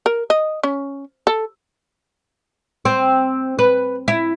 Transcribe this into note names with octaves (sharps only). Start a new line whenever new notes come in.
A#4
D#5
C#4
A4
C4
B4
E4